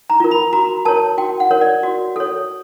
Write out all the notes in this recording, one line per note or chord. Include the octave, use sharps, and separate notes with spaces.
A#5
F4 A#4
B5
F#4 A#5
A#4 C#5 A5
F#4 G5
F#5
A#4 C#5
D5
F#4
A4 C#5